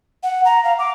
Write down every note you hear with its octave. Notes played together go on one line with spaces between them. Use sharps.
F#5
A#5
F5
D6